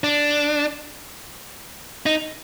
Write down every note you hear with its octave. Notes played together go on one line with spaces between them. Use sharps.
D4
D#4